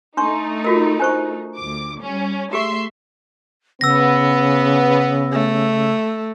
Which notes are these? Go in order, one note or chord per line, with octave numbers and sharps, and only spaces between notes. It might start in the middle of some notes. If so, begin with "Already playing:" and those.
A3 D4 D#4 C6 C#6
F4 F#4 A#4
D4 C5 C#6
D2 D6
G3 C#4
A3 G4 G#4 E5 C6 C#6
C#3 B3 E6 A#6
A3